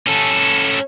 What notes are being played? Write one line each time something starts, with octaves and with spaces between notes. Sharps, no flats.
C#4 A4